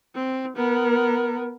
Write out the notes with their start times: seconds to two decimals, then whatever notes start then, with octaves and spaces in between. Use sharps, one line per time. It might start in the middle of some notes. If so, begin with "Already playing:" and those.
0.15 C4
0.56 B3 A#4